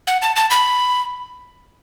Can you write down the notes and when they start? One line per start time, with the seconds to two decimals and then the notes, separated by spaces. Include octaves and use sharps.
0.07 F#5
0.22 A5
0.36 A5
0.50 B5